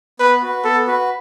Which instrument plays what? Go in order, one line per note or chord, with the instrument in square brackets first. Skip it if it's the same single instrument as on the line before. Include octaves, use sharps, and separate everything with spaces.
[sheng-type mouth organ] B3 [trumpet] B4
[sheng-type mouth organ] F#4 B4
[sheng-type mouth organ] B3 [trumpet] A4
[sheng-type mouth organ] F#4 B4